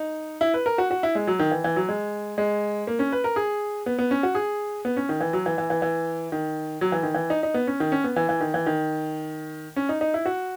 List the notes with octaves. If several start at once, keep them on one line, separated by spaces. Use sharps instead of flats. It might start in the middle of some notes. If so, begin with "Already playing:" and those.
Already playing: D#4
E4
B4
A#4
F#4
F#4
E4
G#3
F#3
D#3
E3
E3
F#3
G#3
G#3
A#3
C#4
B4
A#4
G#4
B3
B3
C#4
F#4
G#4
B3
C#4
D#3
E3
F#3
E3
E3
E3
E3
D#3
F#3
E3
D#3
E3
D#4
D#4
B3
C#4
D#3
C#4
B3
E3
E3
D#3
E3
D#3
C#4
D#4
D#4
E4
F#4